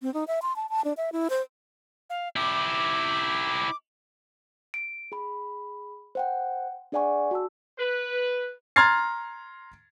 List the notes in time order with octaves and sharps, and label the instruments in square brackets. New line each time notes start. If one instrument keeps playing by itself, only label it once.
[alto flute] C4
D#4
E5
C6
A5
A5
D4
E5
E4
C5
[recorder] F5
[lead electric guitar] E4 G4 [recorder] D6
[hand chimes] D7
G#4 B5
C5 F#5 G5
D4 G#4 D5 F#5 G#5 C#6
F#4 A5 E6
[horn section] B4
[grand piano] A#5 C6 F6 G#6 A6 C7